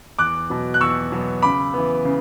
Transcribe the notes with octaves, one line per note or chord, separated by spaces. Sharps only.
E2 D6 F#6
B2 F#3 B3
F#6
E2 C#6 E6
B2 F#3 B3
C#3 B5 D6
E3 B3
C#3